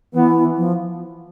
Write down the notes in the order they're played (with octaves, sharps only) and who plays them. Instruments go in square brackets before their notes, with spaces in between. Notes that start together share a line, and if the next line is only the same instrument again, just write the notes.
[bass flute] E3 [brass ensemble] B3
[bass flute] F3